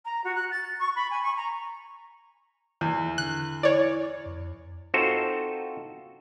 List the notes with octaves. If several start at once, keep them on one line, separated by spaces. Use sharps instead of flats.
A#5
F#4
F#6
A6
C#6
B5
G#5
C#6
A#5
E2 D#3
D3 F#6
E4 C#5 D5
F2
C4 D#4 F4 F#4 A4 C5